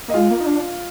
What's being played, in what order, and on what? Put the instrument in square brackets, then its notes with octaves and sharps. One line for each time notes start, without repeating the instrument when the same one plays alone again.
[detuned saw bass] A#3 [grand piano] D#5
[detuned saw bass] G#3 [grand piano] F4 F5
[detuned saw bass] A#3
D#4
D4